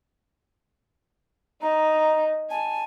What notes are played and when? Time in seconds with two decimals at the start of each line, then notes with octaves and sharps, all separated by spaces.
1.62 D#4 A#5
2.50 G#5 A5